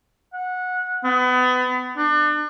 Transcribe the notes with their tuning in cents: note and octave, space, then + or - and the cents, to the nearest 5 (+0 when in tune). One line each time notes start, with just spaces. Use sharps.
F#5 -20
B3 +30
D4 +35